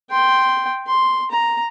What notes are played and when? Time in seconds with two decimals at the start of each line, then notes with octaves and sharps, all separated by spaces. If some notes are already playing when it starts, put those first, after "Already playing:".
0.10 G5 C6
0.87 C6
1.31 A#5